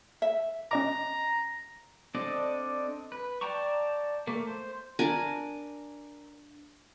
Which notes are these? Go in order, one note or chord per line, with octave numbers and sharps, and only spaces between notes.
E5
C#4 D#5 A#5 D6
C4 D4 A4 D5 D#5
B4
D5 G5 A5 A#5 C#6
A3 A#3
C5
D4 A#4 G#5